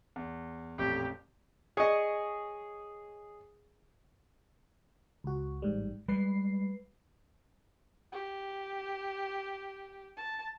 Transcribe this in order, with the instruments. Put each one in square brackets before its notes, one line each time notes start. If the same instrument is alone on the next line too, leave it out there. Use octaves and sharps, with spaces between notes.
[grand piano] E2
[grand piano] A1 F2 A#2 [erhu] G4
[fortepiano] G#4 [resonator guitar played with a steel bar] C#5 D#5
[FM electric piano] C#2 F#4
A1 G#2 G3
[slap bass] G3 G#3 [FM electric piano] B4 C7
[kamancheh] G4
A5